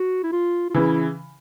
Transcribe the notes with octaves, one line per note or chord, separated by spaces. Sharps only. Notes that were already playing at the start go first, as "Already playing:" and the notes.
Already playing: F#4
E4
F4
F4
C#3 E3 E4